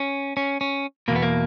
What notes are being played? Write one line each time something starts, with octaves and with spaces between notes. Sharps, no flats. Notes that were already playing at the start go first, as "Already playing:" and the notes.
Already playing: C#4
C#4
C#4
E2 B2 A#3
B3
A#3